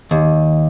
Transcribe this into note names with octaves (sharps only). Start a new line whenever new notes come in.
D#2